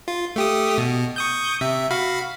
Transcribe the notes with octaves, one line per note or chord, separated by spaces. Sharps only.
F4
A3 G4 D#6
B2
C#6 D#6 G6
C3 E5
F#4 F5 B5